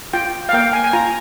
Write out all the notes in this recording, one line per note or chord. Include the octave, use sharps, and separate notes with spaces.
F4 G5
F5
A#3 G5
G#5
G#5
F4 A#5